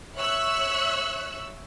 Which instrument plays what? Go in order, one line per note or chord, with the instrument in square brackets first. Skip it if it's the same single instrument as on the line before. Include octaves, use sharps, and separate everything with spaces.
[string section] C#5 E5 C#6 E6 F#6